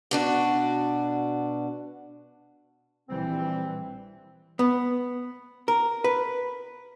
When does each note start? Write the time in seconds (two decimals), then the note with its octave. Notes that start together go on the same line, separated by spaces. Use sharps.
0.11 B2 D4 F#4
3.09 A#1 E3 G3 C4
4.59 B3
5.68 A#4
6.04 B4